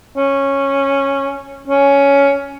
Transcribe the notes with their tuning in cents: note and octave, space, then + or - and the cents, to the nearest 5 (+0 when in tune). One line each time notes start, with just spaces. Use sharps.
C#4 -10
C#4 +10